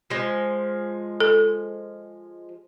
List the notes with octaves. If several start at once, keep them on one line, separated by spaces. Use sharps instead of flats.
F3 G#3
A4